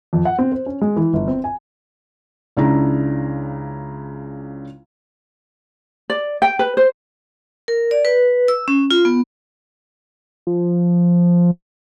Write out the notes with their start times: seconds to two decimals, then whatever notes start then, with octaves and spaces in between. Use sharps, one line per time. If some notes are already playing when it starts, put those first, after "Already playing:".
0.13 F2
0.25 F#5
0.38 C4
0.52 C5
0.66 C#4
0.81 G#3
0.96 E3
1.13 G1
1.28 C4
1.44 G#5
2.57 C#2 C#3 D4 E4 A#5
6.10 D5
6.42 G5
6.59 B4
6.77 C5
7.68 A#4
7.91 D5
8.05 B4
8.48 E6
8.68 C#4
8.91 F4
9.05 B3
10.47 F3